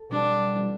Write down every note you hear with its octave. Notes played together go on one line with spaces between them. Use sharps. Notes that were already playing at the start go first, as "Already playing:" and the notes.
Already playing: A4
B2 G3 C4 D4 F#4
G3 C4 E4